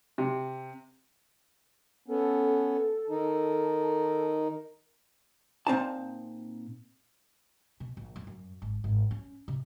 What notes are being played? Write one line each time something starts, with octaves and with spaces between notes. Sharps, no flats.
C3
B3 C#4 A4
D#3 D#4
A#2 C4 D#4 A5
B2
A#1
F#2
F#2
G#1
G#1
C#4
C3